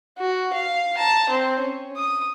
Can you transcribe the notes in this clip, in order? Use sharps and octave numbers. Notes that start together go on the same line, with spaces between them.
F#4
F5
A5 A#5
C4
C#4
D#6